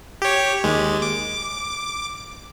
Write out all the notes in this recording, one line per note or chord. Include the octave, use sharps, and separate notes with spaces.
G4 C#5
D#2 G#3
D6